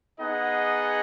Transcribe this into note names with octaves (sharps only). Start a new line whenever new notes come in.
B3 D#4 G#4 D#5 F#5